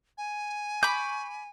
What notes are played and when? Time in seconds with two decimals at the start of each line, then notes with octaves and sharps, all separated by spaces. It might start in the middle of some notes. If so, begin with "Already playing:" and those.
0.18 G#5
0.83 B5 C#6 D6 G6